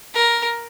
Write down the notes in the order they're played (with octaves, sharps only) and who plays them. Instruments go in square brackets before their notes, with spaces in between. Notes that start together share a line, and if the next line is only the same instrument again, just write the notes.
[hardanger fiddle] A#4